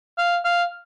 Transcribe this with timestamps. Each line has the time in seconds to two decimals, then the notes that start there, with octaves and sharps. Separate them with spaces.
0.18 F5
0.45 F5